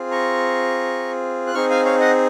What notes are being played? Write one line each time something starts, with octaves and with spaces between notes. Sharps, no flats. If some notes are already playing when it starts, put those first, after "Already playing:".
Already playing: C4 F4 G#4
A#5 C#6
F#6
C4 D#4 G#4 C#6 F6
F5 G#5
C#5 F5
D#5 F#5